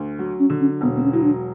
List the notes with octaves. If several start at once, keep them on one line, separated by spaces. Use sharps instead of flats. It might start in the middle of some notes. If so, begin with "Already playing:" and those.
Already playing: D2
F#3
C#4
D3
C#4
E1 B3
B3
C#4
F#3 E4
D4